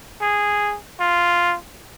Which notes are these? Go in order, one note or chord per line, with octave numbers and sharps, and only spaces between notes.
G#4
F4